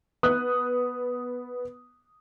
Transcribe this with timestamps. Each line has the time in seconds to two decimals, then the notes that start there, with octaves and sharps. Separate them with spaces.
0.23 B3 D#6 F#6